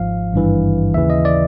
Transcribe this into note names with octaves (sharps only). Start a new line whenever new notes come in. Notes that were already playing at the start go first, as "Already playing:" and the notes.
Already playing: G#1 G#2 F3 F5
G#1 G2 E3
D#2 C#3 E3 E5
D#5
D5